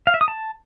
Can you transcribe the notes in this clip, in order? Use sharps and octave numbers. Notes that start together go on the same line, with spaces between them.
F5
E5
D#6
A5